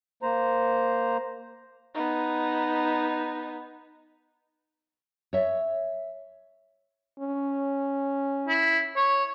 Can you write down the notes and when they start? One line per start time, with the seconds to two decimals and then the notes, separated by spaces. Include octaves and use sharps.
0.23 A#3 C5 A#5
1.95 B3 D#4
5.33 C#5 E5
7.20 C#4
8.48 E4
8.96 C#5